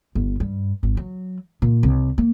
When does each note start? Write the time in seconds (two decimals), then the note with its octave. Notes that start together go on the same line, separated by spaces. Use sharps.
0.15 G1
0.40 G2
0.83 G#1
0.97 F#3
1.62 A#2
1.83 C2
2.18 A#3